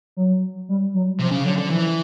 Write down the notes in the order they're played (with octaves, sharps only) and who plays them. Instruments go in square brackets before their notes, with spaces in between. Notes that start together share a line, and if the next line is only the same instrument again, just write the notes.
[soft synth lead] F#3
G3
F#3
[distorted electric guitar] C3 [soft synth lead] F3
[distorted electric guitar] C#3
[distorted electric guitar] D3 [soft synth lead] F#3
[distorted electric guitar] D3
[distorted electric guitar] E3 [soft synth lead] F3